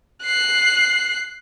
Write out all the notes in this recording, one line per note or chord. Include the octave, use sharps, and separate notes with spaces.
F#6 C7